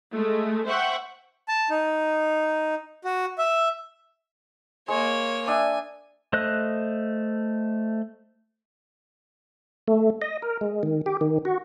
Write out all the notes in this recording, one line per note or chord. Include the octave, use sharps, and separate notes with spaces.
G#3 A3
C5 E5 F#5 G5 C#6
A5
D#4
F#4
E5
G#3 A#3 C#5
D4 E5 G#5 D#6
A3 C5 D#5 F#6
A3
D#5
A#4
G#3
D#3
G4
D#3
F#4